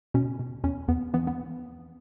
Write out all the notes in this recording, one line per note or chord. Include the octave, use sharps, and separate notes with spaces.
B2 C#4
B2
E2 C#4
E2 B3
E3 B3
B3